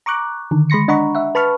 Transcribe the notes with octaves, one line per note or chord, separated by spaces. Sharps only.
A#5 C#6 D6 F#6
D3 D#3
G#3 B5 C6 A#6 C#7
D4 D#5 F#5 A#5 B5 C#6
E5 F#5
B4 A5 B5 C#6 F6